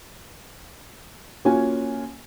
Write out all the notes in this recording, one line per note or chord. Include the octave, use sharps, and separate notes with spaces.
A#3 C#4 F4 F#4 G#5